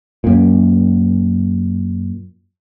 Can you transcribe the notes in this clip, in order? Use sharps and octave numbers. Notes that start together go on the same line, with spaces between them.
F#2 A#2